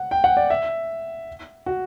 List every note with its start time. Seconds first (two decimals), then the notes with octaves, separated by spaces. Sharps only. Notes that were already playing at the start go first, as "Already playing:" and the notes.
Already playing: F#5
0.11 G5
0.24 F#5
0.37 D5
0.50 E5
1.66 F#4